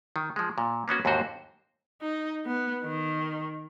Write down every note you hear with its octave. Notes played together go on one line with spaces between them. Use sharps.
D#3
F3 G#3
A#2
A#3 B3 C#4 F#4
D#2 G#2 D3 F#4 C5
D#4
B3
D#3